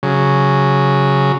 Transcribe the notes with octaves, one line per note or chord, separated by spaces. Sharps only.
C#3 F#3